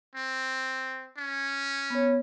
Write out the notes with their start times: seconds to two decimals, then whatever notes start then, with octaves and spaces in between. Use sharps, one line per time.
0.15 C4
1.17 C#4
1.90 B3 C#5